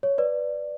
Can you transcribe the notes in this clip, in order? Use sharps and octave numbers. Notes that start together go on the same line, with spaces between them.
C#5
B4 D5